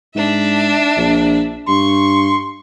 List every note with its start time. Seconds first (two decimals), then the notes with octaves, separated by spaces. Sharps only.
0.15 G#2 D4 E5
0.97 A#1
1.68 G2 C6 C#6